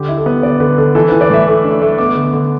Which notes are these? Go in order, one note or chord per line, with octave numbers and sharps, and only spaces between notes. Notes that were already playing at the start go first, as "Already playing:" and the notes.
Already playing: D3 G4
E4
A4
B3
D3 D5
D3 B4
D3 A4
E3 A4
E3 B4
D5
A2 E5
A3
D4
A3
B3 D6
D3
D6
D3